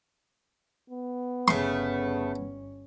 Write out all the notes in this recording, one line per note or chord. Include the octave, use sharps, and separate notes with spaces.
B3
G1 C#3 A3 C#4 C6